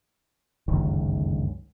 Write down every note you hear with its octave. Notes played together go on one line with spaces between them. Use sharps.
G1 C#2 F#2 D#3